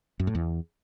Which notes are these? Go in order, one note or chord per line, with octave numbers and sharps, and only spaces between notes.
F#2
A2
E2